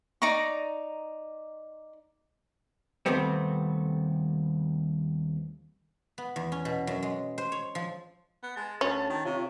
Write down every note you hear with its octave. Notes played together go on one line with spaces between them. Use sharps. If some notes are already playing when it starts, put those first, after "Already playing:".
D#4 D5 A#5 C#6
D#2 C3 G3 A3 B3 C4
B3
E2
C#4
B2
F#2
G#3
C5
C#5
F3
B3
G#3 A5
D2 C#4
D#3
C3 F4 C#5